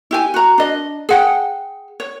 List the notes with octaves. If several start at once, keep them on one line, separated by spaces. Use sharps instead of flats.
E4 G4 G#5
F#4 A#5
D4 D#5
G#4 F#5 G5
C#5